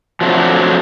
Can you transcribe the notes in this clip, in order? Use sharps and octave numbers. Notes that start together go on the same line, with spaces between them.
F3 F#3 A3 C4 D4